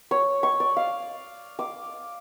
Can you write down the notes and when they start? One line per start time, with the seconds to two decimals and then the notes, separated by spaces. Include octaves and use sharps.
0.11 C#5
0.43 C#6
0.60 D5
0.77 F5
1.59 D6